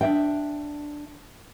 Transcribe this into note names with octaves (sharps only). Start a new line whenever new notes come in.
D4 E5 G5